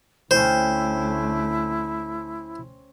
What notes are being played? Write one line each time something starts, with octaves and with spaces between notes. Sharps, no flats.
D2 A3 C4 C#4 E4 C5